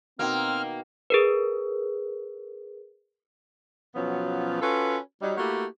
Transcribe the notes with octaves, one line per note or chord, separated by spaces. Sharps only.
B2 D#3 A#3 C4 F6
G#4 A#4 B4
B2 F3 F#3 B3 C#4 F4
C#4 F4 F#4 A4 B4
F#3 G3 D#4
A3 A#3 E4 F#4 G4